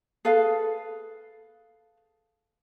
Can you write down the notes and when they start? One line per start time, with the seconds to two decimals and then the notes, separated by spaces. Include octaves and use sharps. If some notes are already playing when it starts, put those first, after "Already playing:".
0.25 G#4 A4 B4 F5